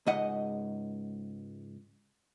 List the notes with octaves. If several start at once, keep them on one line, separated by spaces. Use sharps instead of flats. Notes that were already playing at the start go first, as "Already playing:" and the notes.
C#2 G#2 D#5 F#5